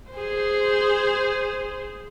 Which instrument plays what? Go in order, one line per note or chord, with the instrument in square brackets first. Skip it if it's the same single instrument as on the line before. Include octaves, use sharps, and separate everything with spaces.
[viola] G#4 C5